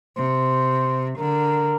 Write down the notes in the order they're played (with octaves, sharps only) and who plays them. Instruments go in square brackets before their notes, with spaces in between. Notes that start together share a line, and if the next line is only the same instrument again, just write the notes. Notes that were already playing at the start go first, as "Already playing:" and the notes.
[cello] C3 [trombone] C5
[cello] D3 [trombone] A#4